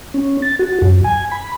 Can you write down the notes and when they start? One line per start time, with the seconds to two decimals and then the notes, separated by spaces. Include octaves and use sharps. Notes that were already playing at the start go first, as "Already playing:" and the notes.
0.14 C#4
0.42 A6
0.59 F#4
0.82 F#2
1.04 G#5
1.32 B5